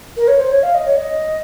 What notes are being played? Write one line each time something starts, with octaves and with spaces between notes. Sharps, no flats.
A#4
C#5
C5
C#5
F5
D#5
C#5
D#5